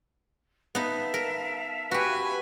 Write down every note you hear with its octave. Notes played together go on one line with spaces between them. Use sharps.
B3 D#4 E5 F5 A5
A#4
F#4 G4 B4 G#5